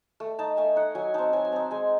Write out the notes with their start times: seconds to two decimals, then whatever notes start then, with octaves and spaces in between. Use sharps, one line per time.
0.20 A3
0.39 D#4 A5
0.57 A3 G#5
0.76 D#4 F#5
0.95 F#3 G#5
1.14 C4 D#4 A5
1.33 F#3 G#5
1.45 G#5
1.52 C4 D#4 A5
1.71 G#3 G#5